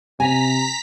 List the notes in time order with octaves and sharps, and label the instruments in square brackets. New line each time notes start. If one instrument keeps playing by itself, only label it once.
[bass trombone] C3 [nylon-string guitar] G#5 [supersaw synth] A#5 B6